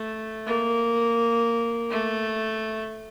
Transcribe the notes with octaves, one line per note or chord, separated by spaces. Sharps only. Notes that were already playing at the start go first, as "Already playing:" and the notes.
Already playing: A3
A#3
A3